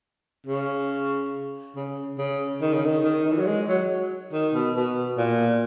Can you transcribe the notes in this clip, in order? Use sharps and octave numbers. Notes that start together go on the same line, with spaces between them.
C#3
C#3
C#3
D#3
C#3
D#3
D#3
D#3
E3
F#3
G#3
F#3
D#3
B2
B2
A#2